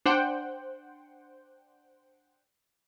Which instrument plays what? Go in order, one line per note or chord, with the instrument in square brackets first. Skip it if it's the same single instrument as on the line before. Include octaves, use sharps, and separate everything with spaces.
[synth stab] D4 C5 F#5 G5